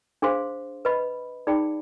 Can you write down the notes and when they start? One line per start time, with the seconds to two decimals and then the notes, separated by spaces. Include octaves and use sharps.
0.22 D4 G#4 C5 F5 C6
0.85 B4 D#5 B5
1.47 D#4 G#4 D5 G5 B5